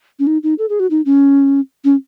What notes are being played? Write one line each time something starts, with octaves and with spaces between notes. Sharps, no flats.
C#4
D#4
D#4
A4
G#4
F#4
D#4
C#4
C#4